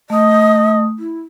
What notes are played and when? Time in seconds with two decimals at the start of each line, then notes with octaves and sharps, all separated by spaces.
0.10 A3 D#5 D#6
0.99 E4